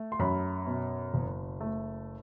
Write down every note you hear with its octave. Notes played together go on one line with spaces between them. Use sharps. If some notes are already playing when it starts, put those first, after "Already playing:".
Already playing: A3
C6
F#2 B5
B2
F#1
A3